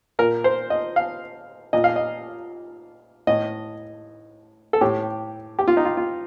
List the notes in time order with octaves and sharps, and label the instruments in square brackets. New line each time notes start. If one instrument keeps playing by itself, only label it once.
[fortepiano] A#2 A#4
C5
D#5
F5
A#2 D#5
F5
D#5
A2 D#5
A4
A2 G4
G4
F4
D#4
F4
F4